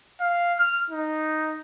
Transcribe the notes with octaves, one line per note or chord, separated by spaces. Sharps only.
F5
F6
D#4